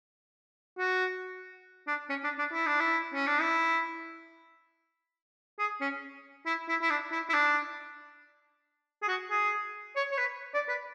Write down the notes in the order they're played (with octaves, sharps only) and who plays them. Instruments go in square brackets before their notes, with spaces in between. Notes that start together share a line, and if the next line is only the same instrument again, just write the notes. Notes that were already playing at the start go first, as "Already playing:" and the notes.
[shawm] F#4
D4
C#4
D4
D4
E4
D4
E4
C#4
D4
E4
G#4
C#4
E4
E4
E4
D4
E4
E4
D4
G#4
F#4
G#4
C#5
C#5
B4
D5
B4